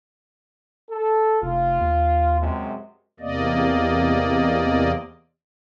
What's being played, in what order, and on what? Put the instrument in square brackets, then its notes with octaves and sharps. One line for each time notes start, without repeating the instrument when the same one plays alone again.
[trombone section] A4
[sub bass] F1 [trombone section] F4
[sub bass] D#2
[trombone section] F#2 C3 G#3
[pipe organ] E2 C3 A#3 D5 D#5